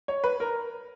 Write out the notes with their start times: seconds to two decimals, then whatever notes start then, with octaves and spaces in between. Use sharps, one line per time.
0.08 C#5
0.24 B4
0.40 A#4